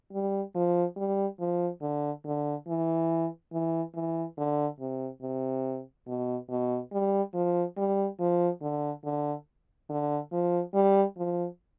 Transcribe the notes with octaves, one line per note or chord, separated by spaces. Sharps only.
G3
F3
G3
F3
D3
D3
E3
E3
E3
D3
C3
C3
B2
B2
G3
F3
G3
F3
D3
D3
D3
F3
G3
F3